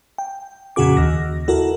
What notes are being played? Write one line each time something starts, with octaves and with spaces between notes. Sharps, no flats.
G5
F2 A#2 C#3 F#4 G#4 D6
D#2 A#6
E4 F#4 A4 A#4